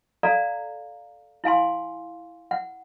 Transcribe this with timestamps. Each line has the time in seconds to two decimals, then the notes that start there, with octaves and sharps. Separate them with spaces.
0.23 A4 D5 F5 A#5
1.44 E4 F5 G#5 C6
2.51 F#5